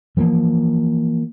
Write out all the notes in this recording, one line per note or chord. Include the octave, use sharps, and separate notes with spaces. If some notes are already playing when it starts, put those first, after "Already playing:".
E3 F3 A3 A#3